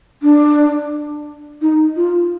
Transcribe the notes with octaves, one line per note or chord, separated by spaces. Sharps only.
D4
D#4
F4